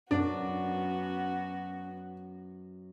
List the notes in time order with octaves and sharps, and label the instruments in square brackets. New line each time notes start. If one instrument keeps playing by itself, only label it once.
[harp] F#2 [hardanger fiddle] B3 F#4 [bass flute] C#4 [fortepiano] D4